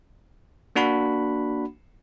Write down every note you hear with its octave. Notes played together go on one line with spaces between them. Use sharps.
A#3 D4 F#4 F#5 B5